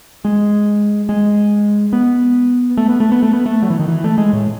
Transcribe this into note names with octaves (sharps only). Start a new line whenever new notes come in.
G#3
G#3
B3
A3
B3
A3
B3
A3
B3
A3
F#3
E3
D#3
E3
A3
G#3
A2